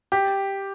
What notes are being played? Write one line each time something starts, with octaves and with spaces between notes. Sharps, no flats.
G4